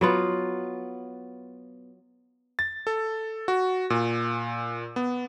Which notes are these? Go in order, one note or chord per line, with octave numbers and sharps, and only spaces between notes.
F#3 B3 F4
A6
A4
F#4
A#2
B3